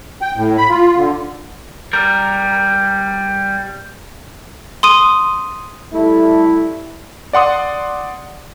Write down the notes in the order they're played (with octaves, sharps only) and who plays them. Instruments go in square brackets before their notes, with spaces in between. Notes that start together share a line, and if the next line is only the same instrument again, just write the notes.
[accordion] G5
A2
B5
F4
D3
[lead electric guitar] G3 A#4
[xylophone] C6 D#6 D#7
[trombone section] G3 A3 E4 A4
[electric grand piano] D5 F#5 C6 D#6